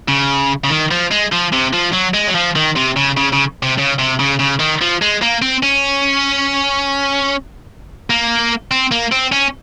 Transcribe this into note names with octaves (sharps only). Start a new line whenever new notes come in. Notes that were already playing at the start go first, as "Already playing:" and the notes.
C#3
C#3
D#3
F3
G#3
F3
C3
F3
F#3
G#3
F#3
F3
D#3
C3
C#3
C#3
C#3
C3
C#3
C3
C#3
C#3
D#3
F3
G#3
A#3
C4
C#4
A#3
C4
A#3
C4
C#4